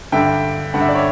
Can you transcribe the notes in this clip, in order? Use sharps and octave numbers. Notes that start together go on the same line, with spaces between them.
G2 D3 E5 G5
G2 D3 F#5
E5
D5
C#5 E5